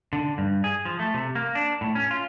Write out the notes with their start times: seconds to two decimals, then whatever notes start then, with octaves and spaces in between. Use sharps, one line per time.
0.13 D3
0.38 G2
0.64 G#4
0.85 F3
0.99 A3
1.14 C3
1.35 A#3
1.55 D4
1.81 A2
1.95 C#4
2.11 F4